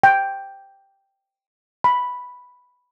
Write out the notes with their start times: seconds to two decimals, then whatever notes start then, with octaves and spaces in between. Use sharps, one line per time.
0.03 G5
1.84 B5